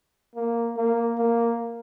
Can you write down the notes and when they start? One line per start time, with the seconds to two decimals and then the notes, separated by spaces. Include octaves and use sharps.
0.35 A#3
0.77 A#3
1.18 A#3